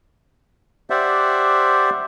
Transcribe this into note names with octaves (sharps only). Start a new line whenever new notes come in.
G4 C5 D5 E5 F#5